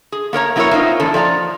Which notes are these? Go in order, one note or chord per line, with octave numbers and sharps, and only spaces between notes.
G#4
A#3 A#4 C#5 A#5
F#3 B3 E4 F#4 A#4 C#5
A#3 C4 D#4 F4
E2 A2 E3 D4 A4
F3 D5 G5 A#5